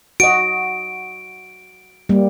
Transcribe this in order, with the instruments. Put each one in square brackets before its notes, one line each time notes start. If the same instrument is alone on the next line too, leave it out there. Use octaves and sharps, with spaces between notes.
[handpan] F#4 D#5 [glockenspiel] D7
[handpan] G3 A#3